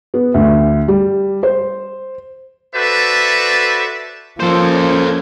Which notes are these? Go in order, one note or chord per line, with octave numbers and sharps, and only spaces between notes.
B3
D2
G3
C5
F#4 A4 B4 C5 D5 E5
F3 A#3 C#4 A4 C5 G6 G#6